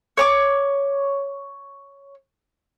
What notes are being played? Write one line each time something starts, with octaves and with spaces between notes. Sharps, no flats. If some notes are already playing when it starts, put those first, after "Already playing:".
C#5 C#6 D6